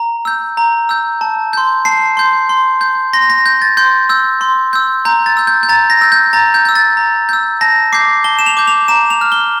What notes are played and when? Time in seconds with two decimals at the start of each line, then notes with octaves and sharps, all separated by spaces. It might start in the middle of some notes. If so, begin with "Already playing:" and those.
Already playing: A#5
0.25 E6 G6
0.57 A#5
0.89 E6 G6
1.21 A5
1.53 C6 G6
1.85 A5 C7
2.17 C6 G6
2.49 C6
2.81 G6
3.13 C6 A#6
3.30 A#6
3.46 G6
3.62 A6
3.77 C6 G6
4.09 E6 G6
4.41 C6
4.73 E6 G6
5.05 A#5 G6
5.26 A6
5.37 E6 G6
5.47 G6
5.63 G6
5.69 A#5 A6
5.90 A#6
6.01 E6 G6
6.12 G6
6.33 A#5 A6
6.54 G6
6.65 E6 G6
6.75 A6
6.97 A#5
7.29 E6 G6
7.61 A5 A#6
7.93 D6 G6 C7
8.24 A5 G7
8.39 E7
8.46 F7
8.57 D6 G6
8.67 F7
8.88 A#5 E7
9.10 F7
9.21 F6
9.32 G7